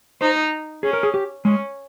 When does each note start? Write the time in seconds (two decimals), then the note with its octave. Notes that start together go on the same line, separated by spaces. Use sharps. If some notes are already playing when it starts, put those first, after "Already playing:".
0.21 D#4 C5
0.83 C#4 G#4
0.93 A#4
1.03 G#4
1.14 G4
1.45 G#3 C#4